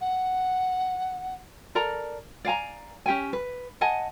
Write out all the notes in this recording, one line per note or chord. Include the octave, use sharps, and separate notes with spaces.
F#5
A4 A#4 D5 A#5
D5 F5 G#5 A#5
C#4 G4 G5 G#5
B4
D#5 F#5 G#5 A5